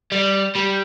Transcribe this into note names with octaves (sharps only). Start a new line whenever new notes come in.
G3
G3